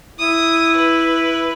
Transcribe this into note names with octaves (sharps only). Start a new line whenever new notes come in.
E4 D#6
B4